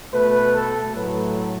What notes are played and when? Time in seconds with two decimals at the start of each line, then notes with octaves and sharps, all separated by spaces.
0.11 B2 A3 B4
0.53 A4
0.94 A2 F#3 A3 B4